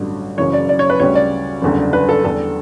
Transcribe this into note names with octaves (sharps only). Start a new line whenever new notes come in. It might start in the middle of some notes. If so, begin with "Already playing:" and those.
Already playing: A1 G2 D3 F#3
F#1 F#2 C#3 E3 C#5
D5
D5
C#5
B4
D2 C#3 G3 C#5
D5
F#1 E2 D3 G3
B4
A4
E2 D3 G3 A4